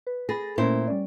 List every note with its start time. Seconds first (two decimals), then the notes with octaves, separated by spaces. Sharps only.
0.07 B4
0.29 G#4 B5 A6 A#6
0.58 A#2 A3 C#4 E4 A#4 C5
0.87 G3 C#4 D5